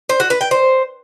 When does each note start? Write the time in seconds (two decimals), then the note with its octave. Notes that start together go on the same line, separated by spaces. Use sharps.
0.09 C5
0.20 F#4
0.30 B4
0.41 G5
0.51 C5